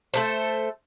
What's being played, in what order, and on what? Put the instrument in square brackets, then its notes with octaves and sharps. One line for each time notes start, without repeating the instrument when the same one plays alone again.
[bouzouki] A3 A4 C5